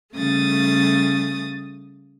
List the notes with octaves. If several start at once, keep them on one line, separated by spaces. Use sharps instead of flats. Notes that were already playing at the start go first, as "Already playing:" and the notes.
C#3 G3 A3 D#6 A6